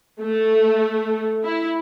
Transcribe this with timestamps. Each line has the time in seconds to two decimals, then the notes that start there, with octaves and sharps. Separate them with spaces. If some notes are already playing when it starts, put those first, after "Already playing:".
0.21 A3
1.44 E4